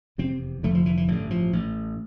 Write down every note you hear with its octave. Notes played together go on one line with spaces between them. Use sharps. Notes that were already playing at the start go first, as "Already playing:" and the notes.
F1 E2 C3 C4
F1 F2 D3 A3
F3
E3
E3
A1 G2 D3 E3
F3
A1 A2